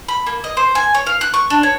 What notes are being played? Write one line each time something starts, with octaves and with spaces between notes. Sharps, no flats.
B5
A#3
D#5
C5
G#5
C#5
F5
F#6
C#6
D4
C#5